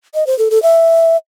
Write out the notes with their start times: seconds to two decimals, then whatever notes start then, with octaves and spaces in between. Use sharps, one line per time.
0.15 D#5
0.27 C5
0.39 A4
0.51 A4
0.63 E5